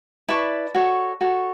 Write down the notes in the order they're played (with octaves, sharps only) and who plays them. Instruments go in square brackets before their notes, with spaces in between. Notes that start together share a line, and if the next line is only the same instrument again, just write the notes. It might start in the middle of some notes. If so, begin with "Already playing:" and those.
[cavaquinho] E4 B4 D5 A5 C#6
F#4 A4 C#5
F#4 A4 C#5